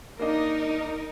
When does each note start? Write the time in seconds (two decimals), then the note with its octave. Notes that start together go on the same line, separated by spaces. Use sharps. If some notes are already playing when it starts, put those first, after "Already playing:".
0.19 A#3 D4 D#4 A#4 D#5